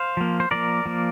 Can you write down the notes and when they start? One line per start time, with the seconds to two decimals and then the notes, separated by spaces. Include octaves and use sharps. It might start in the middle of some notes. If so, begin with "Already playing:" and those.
Already playing: C5 F5
0.17 F3 A#3
0.40 C5
0.51 F3 A#3 A#4 D5
0.85 F3 A#3